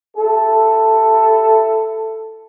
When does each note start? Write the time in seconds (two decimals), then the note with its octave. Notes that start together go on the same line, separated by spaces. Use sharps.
0.17 E4 G4 A4